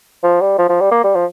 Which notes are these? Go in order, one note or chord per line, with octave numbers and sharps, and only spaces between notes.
F3
G3
F3
F3
G3
A#3
G3
F3